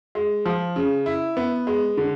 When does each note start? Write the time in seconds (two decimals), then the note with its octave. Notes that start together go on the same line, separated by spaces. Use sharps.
0.15 G#3
0.46 F3
0.76 C#3
1.06 E4
1.37 B3
1.67 G#3
1.97 D3